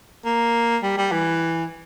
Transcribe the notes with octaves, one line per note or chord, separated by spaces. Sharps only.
A#3
G3
G3
E3